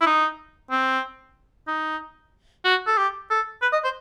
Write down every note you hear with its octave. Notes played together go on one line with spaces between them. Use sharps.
E4
D#4
C4
D#4
F#4
A4
G4
A4
B4
D#5
C5